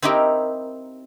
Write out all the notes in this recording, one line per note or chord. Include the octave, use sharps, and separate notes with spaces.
C4 D#4 E4 G4 A#4